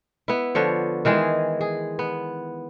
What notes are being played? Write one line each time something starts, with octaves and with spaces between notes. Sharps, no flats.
B3 E4
D3 F3 C#5
D#3 E3 G#3 G#4
G#4
B3